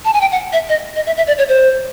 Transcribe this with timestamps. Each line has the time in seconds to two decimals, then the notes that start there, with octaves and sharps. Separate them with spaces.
0.05 A5
0.13 G#5
0.21 G5
0.32 F#5
0.53 E5
0.69 D#5
0.96 D#5
1.06 E5
1.17 E5
1.27 D5
1.38 C#5
1.49 C5